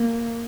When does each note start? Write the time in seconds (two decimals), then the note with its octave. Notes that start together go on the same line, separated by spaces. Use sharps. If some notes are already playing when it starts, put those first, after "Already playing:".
Already playing: A#3